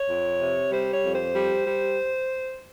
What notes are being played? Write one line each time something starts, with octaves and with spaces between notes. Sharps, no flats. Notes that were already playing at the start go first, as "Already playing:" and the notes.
Already playing: C#5
F2
C3
G3 C5
C#5
F2
C5
G3
G3